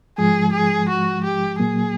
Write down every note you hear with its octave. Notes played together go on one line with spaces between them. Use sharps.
G#2 F3 G#3 G#4
G#4
F#4
G4
A#2 F#3 A#3 G#4